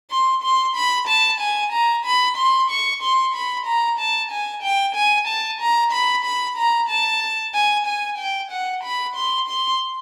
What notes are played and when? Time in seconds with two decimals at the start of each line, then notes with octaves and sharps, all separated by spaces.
0.11 C6
0.43 C6
0.76 B5
1.08 A5
1.41 G#5
1.73 A#5
2.05 B5
2.37 C6
2.70 C#6
3.03 C6
3.35 B5
3.66 A#5
3.99 A5
4.31 G#5
4.63 G5
4.95 G#5
5.28 A5
5.61 A#5
5.92 B5
6.25 B5
6.58 A#5
6.89 A5
7.54 G#5
7.87 G#5
8.18 G5
8.51 F#5
8.84 B5
9.16 C6
9.49 C6